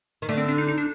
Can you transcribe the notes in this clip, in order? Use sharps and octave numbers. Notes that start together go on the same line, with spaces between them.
D#3
D3 A3
C4
D4
D#4
D#4
D4